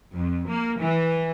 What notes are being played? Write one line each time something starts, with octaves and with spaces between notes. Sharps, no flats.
F2
A#3
E3